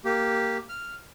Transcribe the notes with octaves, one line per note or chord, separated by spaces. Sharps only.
A#3 G4
F6